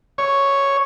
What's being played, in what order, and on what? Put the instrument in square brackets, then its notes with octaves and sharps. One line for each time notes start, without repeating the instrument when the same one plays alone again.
[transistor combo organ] C#5